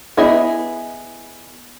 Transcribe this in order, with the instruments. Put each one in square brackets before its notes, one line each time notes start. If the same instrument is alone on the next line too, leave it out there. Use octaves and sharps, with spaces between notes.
[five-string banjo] B3 E4 G#4 D#5 E5